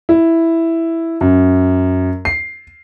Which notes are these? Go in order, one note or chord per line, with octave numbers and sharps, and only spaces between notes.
E4
F#2
C7